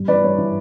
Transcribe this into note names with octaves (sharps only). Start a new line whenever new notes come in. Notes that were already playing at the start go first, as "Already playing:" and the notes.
Already playing: G2
E3 B4 D5
G2 C#5
E3